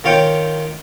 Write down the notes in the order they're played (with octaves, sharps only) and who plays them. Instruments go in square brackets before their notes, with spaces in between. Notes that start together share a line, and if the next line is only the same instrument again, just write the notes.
[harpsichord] D#3 F4 C#5 G5